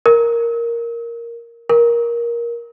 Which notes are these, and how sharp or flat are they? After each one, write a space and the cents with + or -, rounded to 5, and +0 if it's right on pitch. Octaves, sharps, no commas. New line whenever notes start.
A#4 +0
A#4 +15